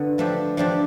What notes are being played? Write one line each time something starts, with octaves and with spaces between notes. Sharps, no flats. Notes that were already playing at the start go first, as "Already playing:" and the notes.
Already playing: D3 B3
F3 A3 D4 G4
F3 A3 D4 G4